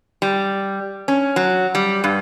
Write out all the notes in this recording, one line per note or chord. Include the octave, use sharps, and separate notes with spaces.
G3
C#4
F#3
G3
G2